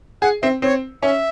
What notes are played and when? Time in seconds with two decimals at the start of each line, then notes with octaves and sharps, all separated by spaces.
0.22 G#4 F#5
0.42 C4 E5
0.62 C4 C#5
1.02 C#4 E5